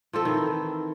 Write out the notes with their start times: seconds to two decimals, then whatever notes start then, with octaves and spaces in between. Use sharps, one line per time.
0.13 F3 C4 A4
0.25 D#3 E3